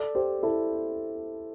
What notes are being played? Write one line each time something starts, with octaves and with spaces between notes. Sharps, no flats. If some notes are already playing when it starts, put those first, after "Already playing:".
Already playing: A4 D5
G4 C5
E4 A4